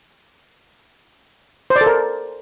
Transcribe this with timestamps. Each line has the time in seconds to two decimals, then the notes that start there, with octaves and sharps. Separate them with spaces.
1.70 C5
1.76 D5
1.81 A4
1.86 A#4